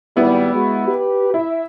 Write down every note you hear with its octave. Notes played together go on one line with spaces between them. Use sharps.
G#1 G3 B3 E4
G#3 F#4
G4 B4
E4 E5